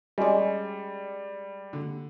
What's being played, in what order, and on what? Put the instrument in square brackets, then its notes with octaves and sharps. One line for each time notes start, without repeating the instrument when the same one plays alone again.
[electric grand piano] G3 [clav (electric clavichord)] G#3 D5 [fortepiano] C#4 F#4
[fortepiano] D3